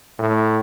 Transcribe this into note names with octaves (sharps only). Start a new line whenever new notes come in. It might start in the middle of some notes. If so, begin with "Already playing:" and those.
A2